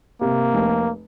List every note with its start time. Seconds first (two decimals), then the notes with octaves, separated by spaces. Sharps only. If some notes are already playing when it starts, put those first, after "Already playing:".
0.21 C3 A#3
0.54 F1